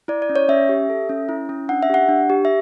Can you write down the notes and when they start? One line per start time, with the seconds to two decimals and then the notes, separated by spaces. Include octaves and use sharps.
0.08 E4 D5
0.22 D5
0.29 C#4
0.36 C#5
0.49 C#4 E5
0.69 G4
0.90 A4
1.09 C#4
1.29 E4
1.49 C#4
1.69 D4 F#5
1.83 E5
1.90 G4 F#5
2.09 D4
2.30 G4
2.45 E5